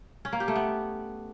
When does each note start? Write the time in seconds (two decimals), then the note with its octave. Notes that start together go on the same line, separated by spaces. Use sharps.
0.25 C#4
0.33 A#3
0.40 G4
0.48 A3
0.56 B3